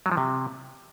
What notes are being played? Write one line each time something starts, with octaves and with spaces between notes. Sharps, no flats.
F#3
F3
C3